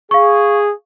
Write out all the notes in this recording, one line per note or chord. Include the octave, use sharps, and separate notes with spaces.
G#4 F5 C#6